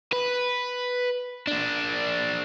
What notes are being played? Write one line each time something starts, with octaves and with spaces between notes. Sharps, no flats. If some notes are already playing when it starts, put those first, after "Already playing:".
B4
A#3 D4